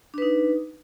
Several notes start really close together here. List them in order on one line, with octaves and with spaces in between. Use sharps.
D4 B4 D#4